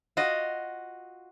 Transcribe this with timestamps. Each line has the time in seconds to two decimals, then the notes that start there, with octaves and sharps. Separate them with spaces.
0.17 F4 F#4 D#5